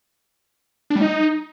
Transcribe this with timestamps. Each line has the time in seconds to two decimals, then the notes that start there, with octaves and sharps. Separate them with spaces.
0.90 D4
0.96 G3
1.01 D#4